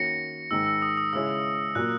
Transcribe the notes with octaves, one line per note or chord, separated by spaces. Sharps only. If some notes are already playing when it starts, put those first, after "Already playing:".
Already playing: D#3 A#3 C#4 F#4 A#6 C#7
G#2 D#3 G#3 D#4 E6
E6
D#6
D#6
C#3 G#3 C#4 E4 E6
A#2 F#3 A#3 F#6